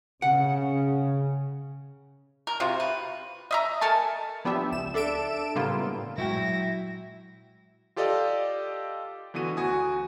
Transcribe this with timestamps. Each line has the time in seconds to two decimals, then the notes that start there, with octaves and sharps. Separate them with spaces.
0.22 C#3 F#5
2.47 A#4
2.60 C3 F4 F#4
2.80 B4
3.51 D#5 E5 A#5
3.81 A4 A#4 G#5 A5
4.45 F3 B3 D4 G4 E5
4.72 C#2 E7
4.94 D4 A4 E5 D7 E7
5.55 A2 C#3 G3 A#3 B3 F4
6.18 A#2 F#3 G#3 E4 F#4 G5 A#6
7.96 F4 G4 A4 D5 D#5 F5
9.34 D3 E3 B3 F#4 D#7
9.57 D2 F#4 G#5 D#6